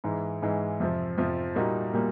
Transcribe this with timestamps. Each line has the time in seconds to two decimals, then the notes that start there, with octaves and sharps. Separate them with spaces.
0.04 G#2 E3 G#3
0.42 G#2 E3 G#3
0.80 F2 C3 F3
1.18 F2 C3 F3
1.55 A#2 G3 A#3 D#4 F#4
1.93 A#2 G3 A#3